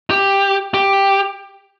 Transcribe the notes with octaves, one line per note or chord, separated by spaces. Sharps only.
G4
G4